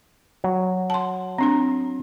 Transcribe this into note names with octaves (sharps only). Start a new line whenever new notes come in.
F#3
A5 C6
C4 D4 A#5